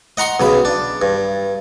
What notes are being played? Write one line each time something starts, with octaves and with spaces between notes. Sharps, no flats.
D#5 F#5 A#5 C6 C#6
B1 C#3 B5
D4
G2